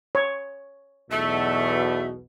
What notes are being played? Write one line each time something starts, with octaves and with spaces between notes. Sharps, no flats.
C#5
B1 E2 B2 A3 E5